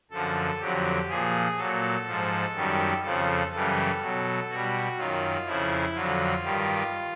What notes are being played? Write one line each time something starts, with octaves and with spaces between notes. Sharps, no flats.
F#2 D3 F3 A4
F2 D3 F#3 G4
A#2 F3 G#4
A#2 F#3 A4
G#2 F3
F#2 D#3 G3
F2 C#3 F3 A4
F#2 C#3 E3 G3 A4
B2 F#3
B2 G3 F#4
F#2 D#3 F#3 F4
F2 C#3 F3 E4
F2 D3 F#3 F4
G2 D#3 G3